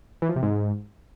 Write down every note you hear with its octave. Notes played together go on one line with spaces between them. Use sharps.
E3
F3
C3
G#2